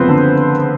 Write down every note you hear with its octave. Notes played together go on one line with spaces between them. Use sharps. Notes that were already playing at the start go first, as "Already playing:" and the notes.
Already playing: F#1 F3 B3 C4 B4 C5
D3